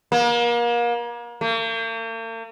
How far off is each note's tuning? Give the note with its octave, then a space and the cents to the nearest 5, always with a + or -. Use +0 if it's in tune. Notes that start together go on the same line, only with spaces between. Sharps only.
A#3 +35
A#3 -45